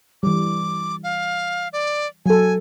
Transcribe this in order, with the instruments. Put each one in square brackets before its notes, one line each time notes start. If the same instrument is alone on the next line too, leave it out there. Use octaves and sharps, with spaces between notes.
[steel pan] E3 G3 [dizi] D6
[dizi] F5
D5
[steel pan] F#3 A4 [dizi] G#5